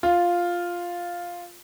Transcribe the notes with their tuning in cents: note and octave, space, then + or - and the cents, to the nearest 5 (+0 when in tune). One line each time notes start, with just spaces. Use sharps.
F4 +0